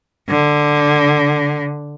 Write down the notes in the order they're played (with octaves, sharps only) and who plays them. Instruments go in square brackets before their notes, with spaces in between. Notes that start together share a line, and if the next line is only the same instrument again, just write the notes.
[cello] D3